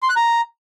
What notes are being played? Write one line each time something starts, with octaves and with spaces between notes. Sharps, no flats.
C6
F#6
A#5